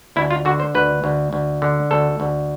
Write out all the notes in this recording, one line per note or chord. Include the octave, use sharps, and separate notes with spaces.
D2 E4
F4
D3 F#4
C5
D2 B4
D2
D2
D3
D2 A4
D2